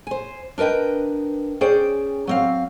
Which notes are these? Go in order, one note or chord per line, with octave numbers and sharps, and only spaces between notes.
C5 G#5
D4 A#4 B4 D#5 G5
C#4 G#4 C5 D5 G5
F#3 C4 F5